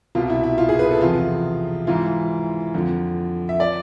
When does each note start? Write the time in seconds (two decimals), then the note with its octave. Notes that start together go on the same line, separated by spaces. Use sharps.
0.15 C2 B2 F4
0.30 E4
0.43 E4
0.58 F4
0.69 G#4
0.79 B4
0.91 A4
1.01 E2 C3 F3 F4
1.87 G#2 E3 F4
2.74 F2 D3 F3
3.49 E5
3.60 F3 D5